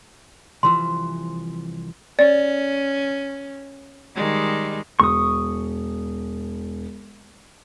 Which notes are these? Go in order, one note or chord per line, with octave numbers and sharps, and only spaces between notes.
C2 E3 F3 C6
C#4 D5
D#3 G3 G#3
E1 C#6 D#6